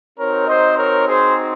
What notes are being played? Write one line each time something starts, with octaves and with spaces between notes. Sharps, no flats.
C4 D#4 F#4 A#4 C#5
C5 D#5
A#4 C#5
G#4 C5